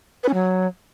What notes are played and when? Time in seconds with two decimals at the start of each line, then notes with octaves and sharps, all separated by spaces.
0.23 B4
0.29 C#4
0.34 F#3